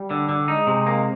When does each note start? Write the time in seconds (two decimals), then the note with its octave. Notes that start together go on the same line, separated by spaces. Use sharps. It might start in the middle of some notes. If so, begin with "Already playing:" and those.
Already playing: G3
0.11 D3
0.29 D3
0.48 G#3 D#4
0.67 C3
0.86 A#3